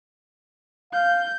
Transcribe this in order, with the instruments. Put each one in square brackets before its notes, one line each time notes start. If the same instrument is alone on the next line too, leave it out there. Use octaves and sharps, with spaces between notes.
[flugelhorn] F5 [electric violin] G6